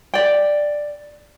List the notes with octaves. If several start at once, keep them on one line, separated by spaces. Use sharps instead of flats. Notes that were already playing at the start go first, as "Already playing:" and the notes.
D5 G5